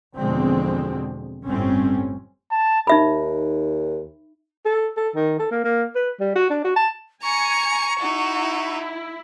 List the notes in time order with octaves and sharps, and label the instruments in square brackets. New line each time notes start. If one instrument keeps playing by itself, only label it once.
[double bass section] E2 B2 D3 F3 G#3 C4
G1 A2 G3 C4 C#4
[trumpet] A5
[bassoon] D#2 [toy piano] D#4 E5 B5
[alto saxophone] A4
A4
D#3
A4
A#3
A#3
B4
G3
F#4
D4
F#4
A5
[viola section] G#5 [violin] A#5 C#7 [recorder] C#6
[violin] D#4 F#4 [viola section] E4